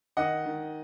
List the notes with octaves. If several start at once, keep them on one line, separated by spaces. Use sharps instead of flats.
D#3 D#5 F#5
D#3